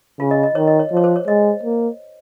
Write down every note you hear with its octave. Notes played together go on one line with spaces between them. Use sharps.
C#3 F4
D#5
D#5
D#3 C#5
D#5
C#5
F3 C#5
C5
C#5
G#3 D#5
A#3